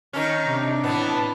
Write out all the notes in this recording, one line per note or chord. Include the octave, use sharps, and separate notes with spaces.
D#3 C#4 D#4
C3 C4 D4
A2 E3 B3 A5